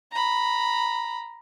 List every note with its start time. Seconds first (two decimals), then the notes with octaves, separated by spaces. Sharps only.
0.12 A#5 B5